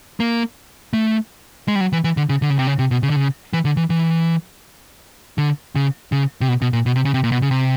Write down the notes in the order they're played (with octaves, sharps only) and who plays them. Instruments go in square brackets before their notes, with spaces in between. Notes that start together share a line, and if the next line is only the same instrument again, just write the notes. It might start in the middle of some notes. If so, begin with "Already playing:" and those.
[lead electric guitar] A#3
A3
G#3
G3
F#3
E3
E3
D3
C#3
D3
C#3
C3
C#3
C3
B2
C#3
D3
C#3
E3
D3
E3
E3
D3
C#3
C#3
C3
B2
B2
A#2
B2
C3
C#3
C3
A#2
B2
C#3
C3